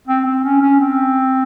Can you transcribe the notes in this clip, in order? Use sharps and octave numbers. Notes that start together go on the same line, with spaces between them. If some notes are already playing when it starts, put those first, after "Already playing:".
C4
C4
C#4
C#4
C4